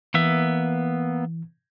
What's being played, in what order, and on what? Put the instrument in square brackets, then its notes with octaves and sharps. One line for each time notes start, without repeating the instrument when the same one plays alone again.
[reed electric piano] E3 [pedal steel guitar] A#3 B3 E5